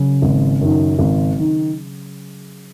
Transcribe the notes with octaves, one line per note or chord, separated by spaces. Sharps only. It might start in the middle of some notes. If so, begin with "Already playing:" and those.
Already playing: C#3 F#3
G#1
F#2 D#3
G#1
D#3